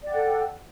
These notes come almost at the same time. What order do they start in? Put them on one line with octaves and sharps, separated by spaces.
D5 G5 F#5 A4